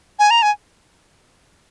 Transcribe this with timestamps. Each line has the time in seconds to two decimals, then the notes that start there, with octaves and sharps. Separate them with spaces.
0.19 G#5
0.31 A#5
0.42 G#5